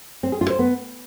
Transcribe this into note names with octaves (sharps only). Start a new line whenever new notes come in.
C4
G#4
F4
C5
B3